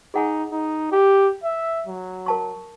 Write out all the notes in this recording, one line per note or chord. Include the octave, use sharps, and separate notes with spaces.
D#4 G#4 F#5 G#5
D#4
G4
E5
F#3
A#4 A5 C#6